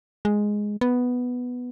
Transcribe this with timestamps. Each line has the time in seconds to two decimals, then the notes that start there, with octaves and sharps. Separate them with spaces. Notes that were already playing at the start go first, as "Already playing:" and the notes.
0.25 G#3
0.81 B3